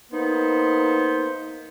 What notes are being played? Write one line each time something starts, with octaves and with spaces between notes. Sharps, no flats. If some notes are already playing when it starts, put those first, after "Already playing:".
A#3 B3 D#4 C5